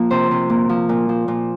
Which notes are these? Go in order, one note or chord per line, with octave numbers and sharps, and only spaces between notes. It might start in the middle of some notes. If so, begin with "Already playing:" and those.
Already playing: F3 A#3 A#4
C3 C5
C3
A#3
F3
A#2
F3
A#2